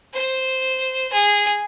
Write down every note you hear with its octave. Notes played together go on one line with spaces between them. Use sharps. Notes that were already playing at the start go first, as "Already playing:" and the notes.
C5
G#4